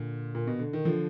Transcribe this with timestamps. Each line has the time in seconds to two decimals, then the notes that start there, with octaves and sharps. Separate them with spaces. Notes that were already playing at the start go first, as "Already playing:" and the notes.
Already playing: A#2 D3
0.35 A#2
0.47 B2
0.59 D3
0.73 D#3
0.85 D3 F3